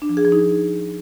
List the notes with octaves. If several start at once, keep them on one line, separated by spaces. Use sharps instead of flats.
D4
F3
G#4
F3
D#4